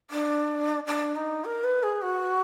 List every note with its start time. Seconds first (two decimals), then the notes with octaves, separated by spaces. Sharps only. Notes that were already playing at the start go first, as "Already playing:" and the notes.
0.10 D4
0.86 D4
1.15 D#4
1.44 A#4
1.63 B4
1.82 G#4
2.01 F#4